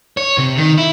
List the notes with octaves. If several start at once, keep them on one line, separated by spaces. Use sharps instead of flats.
C#5
C3
D#3
E4